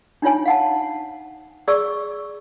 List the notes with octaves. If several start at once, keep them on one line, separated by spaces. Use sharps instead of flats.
D4 D#4 F4 C#5 G#5
F5 F#5 A5
G#4 D5 C#6 E6